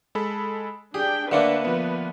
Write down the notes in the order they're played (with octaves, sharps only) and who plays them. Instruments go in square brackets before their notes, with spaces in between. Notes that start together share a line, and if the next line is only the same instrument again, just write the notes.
[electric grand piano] G#3 A4 B5
[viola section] D4 G5 [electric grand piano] G4 [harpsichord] G#4
[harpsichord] D3 A3 A#3 [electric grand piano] D4 C#7 E7 [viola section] B4
[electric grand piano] F3 B3